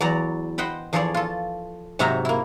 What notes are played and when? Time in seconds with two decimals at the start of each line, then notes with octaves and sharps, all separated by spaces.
0.01 E2 F#3 D5 A#5
0.58 C5 D#5 F#5 G5 B5
0.93 E2 F3 G#4 A4 C#5 D5
1.14 F4 A4
1.99 G#2 C3 F#3 D#4 E5 A#5
2.25 A#3 E4